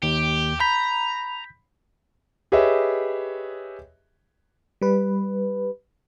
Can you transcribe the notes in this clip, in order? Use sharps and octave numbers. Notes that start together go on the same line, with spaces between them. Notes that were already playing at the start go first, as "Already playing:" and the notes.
D#2 G4
A#5 B5 G6 B6
G4 G#4 B4 C#5 D#5 E5
G3 B4